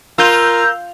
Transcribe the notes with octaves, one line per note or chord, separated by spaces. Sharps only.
F4 A#4 E6 G6